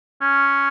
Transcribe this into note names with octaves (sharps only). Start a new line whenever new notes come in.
C#4